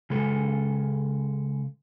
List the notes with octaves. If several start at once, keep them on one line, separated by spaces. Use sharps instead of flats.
C#3 G#3 A4